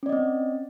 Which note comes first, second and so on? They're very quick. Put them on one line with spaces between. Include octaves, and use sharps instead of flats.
C#4 D5 D#5 C4